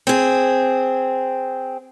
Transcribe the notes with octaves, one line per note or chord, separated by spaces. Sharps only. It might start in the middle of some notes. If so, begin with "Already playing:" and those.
C4 G#4